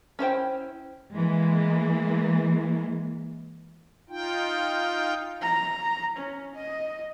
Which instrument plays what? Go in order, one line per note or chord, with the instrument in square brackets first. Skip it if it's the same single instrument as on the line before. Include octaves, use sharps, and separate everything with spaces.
[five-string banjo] C#4 E4 C5 G5
[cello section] E3 G#3 A#3
[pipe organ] D#4 F4 G5
[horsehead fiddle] A#5
C#4
D#5